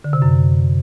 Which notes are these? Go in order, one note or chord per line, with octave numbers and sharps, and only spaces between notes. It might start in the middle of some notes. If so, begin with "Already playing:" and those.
D3
C3
F#2